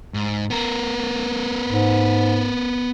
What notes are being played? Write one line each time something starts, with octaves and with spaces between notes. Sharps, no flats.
G#2
B3 A#4
G#2